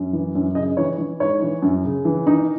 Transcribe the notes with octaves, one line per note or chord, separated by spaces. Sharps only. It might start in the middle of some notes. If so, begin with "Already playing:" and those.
Already playing: F#2
E3
F#2
C#3 D#5
E3 C#5
E3
G#2 C#5
E3
F#2
C#3
E3
D#3 D#4